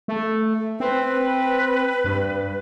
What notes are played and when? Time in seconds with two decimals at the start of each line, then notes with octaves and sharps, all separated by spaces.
0.08 A3
0.80 C4 B4
2.04 G2